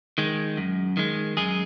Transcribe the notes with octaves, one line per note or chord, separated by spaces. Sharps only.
D#3 G#3
F#2
D#3 G#3
F#2 G#3 G#4